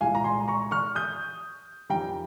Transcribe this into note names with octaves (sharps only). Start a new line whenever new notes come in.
C2 A#2 G#3 F5 G#5
A#5
G#5 C6
A#5 C#6
C#6 F6
D#6 G6
F2 D#3 G3 G5 A#5